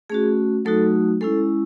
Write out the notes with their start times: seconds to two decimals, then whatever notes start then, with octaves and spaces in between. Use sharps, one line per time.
0.10 A3 C#4 F#4 G#4
0.65 F#3 A3 D#4 F#4 A4
1.21 G#3 C#4 E4 A4